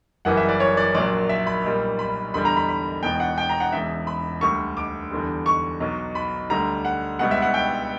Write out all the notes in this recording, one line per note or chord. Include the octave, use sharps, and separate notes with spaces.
F#1 F#2 E3 G3 F#5
E5
D5
C#5
D5
A#1 A#2 F#3 D5
E5
B5
B1 A#2 G3
B5
E2 D3 G3 B5
A#5
B5
B5
E1 E2 B2 G5
F#5
G5
A#5
F#5
E1 E2 C#3 E5
B5
D2 D3 G3 C#6
D6
E2 D3 G3
C#6
B1 B2 F#3
B5
D2 D3 G3 A#5
F#5
C#2 B2 G3 F#5
E5
F#5
G5